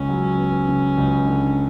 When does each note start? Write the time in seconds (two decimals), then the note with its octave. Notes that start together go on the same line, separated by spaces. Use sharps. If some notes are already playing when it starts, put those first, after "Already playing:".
Already playing: C#2 C#3 C#4
0.09 F#3
0.38 B3
0.68 C#3
0.97 C#2
1.26 D3